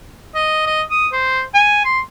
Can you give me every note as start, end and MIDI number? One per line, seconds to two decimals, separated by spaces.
0.35 0.63 75
0.67 0.82 75
0.91 1.07 87
1.12 1.42 72
1.54 1.84 80
1.85 2.00 84